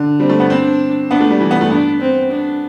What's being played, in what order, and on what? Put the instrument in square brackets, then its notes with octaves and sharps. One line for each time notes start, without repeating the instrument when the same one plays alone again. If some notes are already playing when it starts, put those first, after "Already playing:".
Already playing: [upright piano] D3
[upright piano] G3 [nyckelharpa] C4
[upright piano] A3
B3
[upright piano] C4 [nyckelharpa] D4
[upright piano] B3 [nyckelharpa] D4
[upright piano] A3
G3
E3
B3
A3
[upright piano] B3 [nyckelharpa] D4
[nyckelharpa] C4
D4